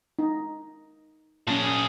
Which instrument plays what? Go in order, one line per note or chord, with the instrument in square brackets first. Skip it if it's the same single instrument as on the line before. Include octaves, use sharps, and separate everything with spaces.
[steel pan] D#4
[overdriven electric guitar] A#2 G#4 [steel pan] C#4 A5